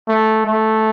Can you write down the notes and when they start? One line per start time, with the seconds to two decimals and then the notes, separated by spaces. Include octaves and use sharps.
0.09 A3
0.46 A3